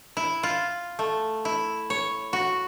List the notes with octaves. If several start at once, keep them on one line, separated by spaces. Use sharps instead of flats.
E4
F4
A3
E4
C#5
F#4